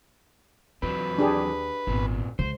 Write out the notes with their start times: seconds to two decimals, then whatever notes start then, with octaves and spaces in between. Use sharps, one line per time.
0.82 D#2 E3 F#3 C4 B4
1.18 D4 G4 G#4
1.87 G#1 A#2 B3 C4
2.39 C#2 C5